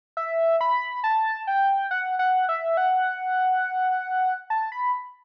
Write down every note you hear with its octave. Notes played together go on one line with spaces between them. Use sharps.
E5
B5
A5
G5
F#5
F#5
E5
F#5
A5
B5